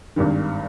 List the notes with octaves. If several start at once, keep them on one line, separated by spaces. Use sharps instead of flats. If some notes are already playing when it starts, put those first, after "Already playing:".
G#1 G2 D#3